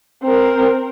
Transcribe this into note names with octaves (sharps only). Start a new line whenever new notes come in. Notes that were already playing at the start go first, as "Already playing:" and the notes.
C4 A#4